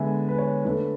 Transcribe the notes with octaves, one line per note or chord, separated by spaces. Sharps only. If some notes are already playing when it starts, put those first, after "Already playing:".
Already playing: D3 G#3 B3 E5 G#5
B4
C#5
D3 A3 B4